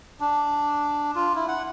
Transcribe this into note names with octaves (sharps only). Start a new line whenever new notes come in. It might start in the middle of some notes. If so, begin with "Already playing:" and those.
D4
F4
E4
F#5